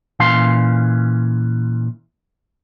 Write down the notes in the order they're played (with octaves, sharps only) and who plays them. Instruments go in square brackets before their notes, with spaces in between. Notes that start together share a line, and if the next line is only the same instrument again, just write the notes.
[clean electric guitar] A#2 E3 C#4 F5 C6